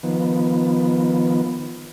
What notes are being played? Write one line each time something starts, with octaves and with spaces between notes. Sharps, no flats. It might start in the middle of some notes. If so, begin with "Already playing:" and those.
D#3 F3 B3